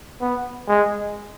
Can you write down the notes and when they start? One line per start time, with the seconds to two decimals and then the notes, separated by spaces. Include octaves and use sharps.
0.21 B3
0.68 G#3